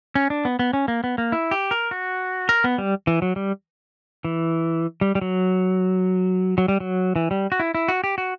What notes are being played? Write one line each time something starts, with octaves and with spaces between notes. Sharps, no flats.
C#4
D4
B3
B3
C#4
A#3
B3
A#3
E4
G4
A#4
F#4
A#4
B3
G3
E3
F#3
G3
E3
G3
G3
F#3
F#3
G3
F#3
E3
G3
F#4
E4
E4
F#4
G4
F#4